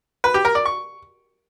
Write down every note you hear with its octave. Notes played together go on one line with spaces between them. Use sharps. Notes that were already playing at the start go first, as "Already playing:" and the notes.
B4
G4
A#4
D5
C#6